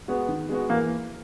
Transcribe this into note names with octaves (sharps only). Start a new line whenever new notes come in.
G#3 B3 F#4
D#3
G#3 B3 F#4
E3 A#3